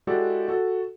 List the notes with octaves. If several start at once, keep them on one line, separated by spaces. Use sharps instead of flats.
G#3 E4 F#4 G4 A4 D5
F#4 A4